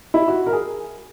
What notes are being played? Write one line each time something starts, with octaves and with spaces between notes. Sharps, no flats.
E4
F#4
A#4
G#4